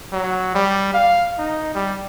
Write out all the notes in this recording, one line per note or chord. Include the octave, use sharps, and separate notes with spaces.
F#3
G3
F5
D#4
G3